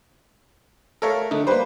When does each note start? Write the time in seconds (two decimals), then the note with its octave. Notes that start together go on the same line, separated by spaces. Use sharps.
1.02 A3 A4 A#4 C#5 F5
1.31 D3 A3 D#4
1.47 G3 A#3 B4 C5